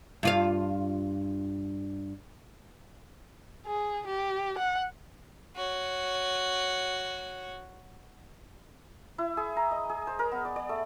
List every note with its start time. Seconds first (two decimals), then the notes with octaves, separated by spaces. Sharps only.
0.23 G2 F4 F5
3.66 G#4
4.07 G4
4.58 F#5
5.56 F#4 C#5
9.18 E4
9.37 G#4
9.57 A#5
9.71 D#5
9.89 G#4
10.07 C5
10.19 A#4
10.32 B3
10.45 D5
10.56 D5
10.69 A3